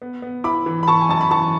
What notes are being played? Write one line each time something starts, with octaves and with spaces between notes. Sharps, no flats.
B3
B3
E4 B5 D6
E3
B5
E3 A5 C#6
G#5
F#2 A5
B5
E3 A5 C#6